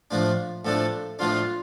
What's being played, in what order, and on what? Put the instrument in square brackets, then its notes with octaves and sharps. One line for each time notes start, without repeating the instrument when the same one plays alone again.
[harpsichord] A2 F3 D4 [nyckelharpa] F4
[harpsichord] A2 F3 D4 [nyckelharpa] A4
[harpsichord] A2 F3 D4 [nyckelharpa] F4